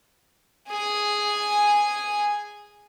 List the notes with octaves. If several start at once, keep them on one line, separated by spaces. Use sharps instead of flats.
G#4 G#5